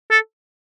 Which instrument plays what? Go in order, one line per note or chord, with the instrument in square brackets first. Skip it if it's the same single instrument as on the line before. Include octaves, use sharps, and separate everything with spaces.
[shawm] A4